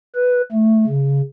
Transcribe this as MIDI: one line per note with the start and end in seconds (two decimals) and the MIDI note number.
0.15 0.42 71
0.52 0.85 57
0.87 1.22 49